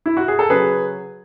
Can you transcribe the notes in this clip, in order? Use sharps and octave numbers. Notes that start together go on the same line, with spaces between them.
E4
F#4
G#4
A4
C#3 F#3 G#4 B4